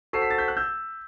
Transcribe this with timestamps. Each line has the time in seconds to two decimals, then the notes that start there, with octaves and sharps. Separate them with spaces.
0.13 F#4 A4 C5 F#5 A5 C7
0.22 B6
0.30 A6
0.38 G6 B6
0.48 F#6
0.57 E6 G6